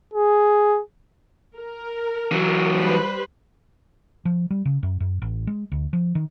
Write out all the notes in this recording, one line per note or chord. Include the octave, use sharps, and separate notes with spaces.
G#4
A#4
E3 F#3
G3 B4 C5
F3
G3
C#3
F#2
F#2
A1
G#3
D2
F3
D#3